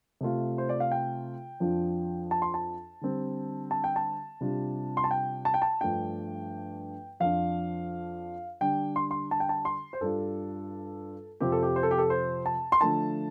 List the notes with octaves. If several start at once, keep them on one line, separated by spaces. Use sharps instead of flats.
C3 A3 F4
C5
D5
F5
G5
F2 F3 D4 F4
A5
C6
A5
D3 G3 C4
A5
G5
A5
C3 G3 D4 F4
C6
A5
G5
A5
G5
A5
G2 F3 A3 D4 G5
F2 F3 D4 F4 F5
D3 G3 D4 G5
C6
C6
A5
G5
A5
C6
C5
G2 G3 D4 F4 A4
F2 C3 F3 C4 G4
A4
G4
C5
A4
G4
A4
C5
A5
C6
D3 F3 A3 D4 A5